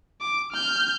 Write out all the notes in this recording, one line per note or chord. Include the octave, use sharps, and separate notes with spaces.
D6
F6 G6